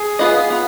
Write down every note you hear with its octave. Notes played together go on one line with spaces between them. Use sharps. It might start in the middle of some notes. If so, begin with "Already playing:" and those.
Already playing: G#4
B3 F4 B4 D#5
B3 F4